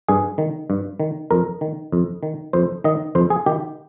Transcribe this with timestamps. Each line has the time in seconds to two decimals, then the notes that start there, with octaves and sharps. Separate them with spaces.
0.09 G2 G#4
0.38 D#3
0.70 G2
1.00 D#3
1.31 F2 A#4
1.61 D#3
1.92 F2
2.23 D#3
2.53 F2 C5
2.84 D#3 D#5
3.15 F2 C5
3.30 G#4
3.46 D#3 G4